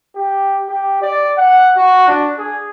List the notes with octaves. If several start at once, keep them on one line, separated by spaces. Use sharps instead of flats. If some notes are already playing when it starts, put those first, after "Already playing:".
G4
G4
D5
F#5
F#4
D4
G#4